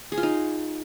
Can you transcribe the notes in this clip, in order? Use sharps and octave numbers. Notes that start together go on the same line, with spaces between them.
G#4
F4
D#4